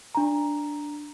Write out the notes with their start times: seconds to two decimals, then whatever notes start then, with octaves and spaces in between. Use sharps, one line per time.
0.15 D4 A#5